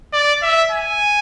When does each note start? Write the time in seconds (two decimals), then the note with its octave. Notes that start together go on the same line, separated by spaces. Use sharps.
0.13 D5
0.42 E5
0.72 G#5